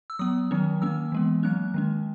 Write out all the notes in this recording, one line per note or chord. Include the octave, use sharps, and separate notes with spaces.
E6
F#3 B3 D#6
D#3 F#3 C#4
D#3 A#3 C#4 E6
E3 G#3 B3
F#3 A#3 C#4 F#6
D#3 G#3 C#4